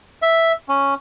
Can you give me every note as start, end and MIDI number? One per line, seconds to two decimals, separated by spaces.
0.22 0.52 76
0.69 0.94 61